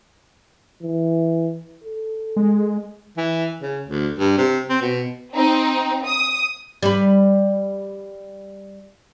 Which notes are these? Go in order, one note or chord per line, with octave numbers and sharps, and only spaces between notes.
E3
A4
G#3
E3
C#3
D2
G2
C3
C4
B2
C4 D#4
D#6
G3 B4